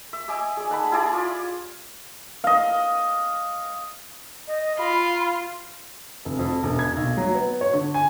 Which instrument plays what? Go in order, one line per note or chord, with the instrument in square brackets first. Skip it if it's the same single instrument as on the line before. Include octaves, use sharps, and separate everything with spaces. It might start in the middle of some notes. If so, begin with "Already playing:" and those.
[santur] E5
D#5 E5 G#5 D6
G#4 D5
D#4 F#5 A5 B5
E4 G4 G#4 D5
F4 D5
[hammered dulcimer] D#5 F5
[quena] D#5
[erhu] F4 [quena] B5
[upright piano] F1
F2
E1
G#6
B1
F#3
B3
C#5
D3
G#5